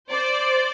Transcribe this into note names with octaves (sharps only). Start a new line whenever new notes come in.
C5 D5